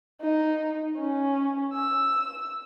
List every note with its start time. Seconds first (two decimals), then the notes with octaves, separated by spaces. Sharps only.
0.22 D#4
0.99 C#4
1.74 E6